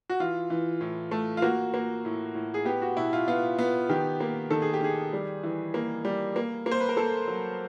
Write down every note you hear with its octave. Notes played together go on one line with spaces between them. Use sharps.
F#4
E3 F4
E3
A2
A3
F4
A#3 F#4
A#3
A2
A2
G#4
B3 G4
F#4
B2 E4
F4
B3 F4
B3
D#3 G4
A#3
D#3 A4
G#4
G4
D#3 G#4
G3
E3
A#3
G3
A#3
A#3
C5
B4
A#4
A#3 A4
F#3